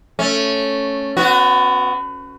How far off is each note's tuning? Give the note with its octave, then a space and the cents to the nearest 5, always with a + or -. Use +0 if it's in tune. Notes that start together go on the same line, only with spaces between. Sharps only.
A3 +0 C#4 +0
B3 +30 F#4 -15